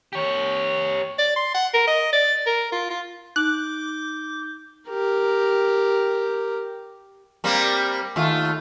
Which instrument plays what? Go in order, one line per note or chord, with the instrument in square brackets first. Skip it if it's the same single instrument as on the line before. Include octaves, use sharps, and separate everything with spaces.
[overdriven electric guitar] G4 C#5
[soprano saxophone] D5
C6
F#5
A#4
D#5
D5
A#4
F4
F4
[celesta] D#4 [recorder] D6 [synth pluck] F#6 [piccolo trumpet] G6
[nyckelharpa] G4 A#4
[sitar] G3 A#3 C4
D#2 A3 F4